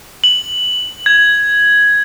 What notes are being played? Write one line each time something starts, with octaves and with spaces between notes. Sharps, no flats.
F#7
G#6